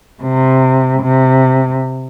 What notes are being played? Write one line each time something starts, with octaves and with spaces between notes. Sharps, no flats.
C3
C3